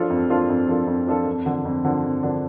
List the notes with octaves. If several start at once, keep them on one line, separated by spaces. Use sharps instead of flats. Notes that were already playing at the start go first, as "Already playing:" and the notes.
Already playing: F3 D4 F4 A4
F2
F3 D4 F4 A4
F2
F3 D4 F4 A4
F2
F3 D4 F4 A4
F2
D3 F3 D4
F2
D3 F3 D4
F2
D3 F3 D4